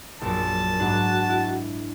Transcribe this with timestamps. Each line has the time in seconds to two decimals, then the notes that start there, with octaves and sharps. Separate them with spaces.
0.21 A#1 F#2 A5
0.79 G#2 D4 F#4
1.29 E4